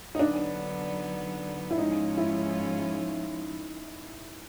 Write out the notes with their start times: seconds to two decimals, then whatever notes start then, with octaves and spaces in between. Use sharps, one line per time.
0.15 D#4
0.19 D3 F#3 B3 D4
1.71 E4
1.78 G#2 F3 G#3 C#4 D#4 F4
2.17 E4